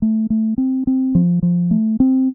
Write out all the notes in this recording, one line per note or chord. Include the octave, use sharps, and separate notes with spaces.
A3
A3
C4
C4
F3
F3
A3
C4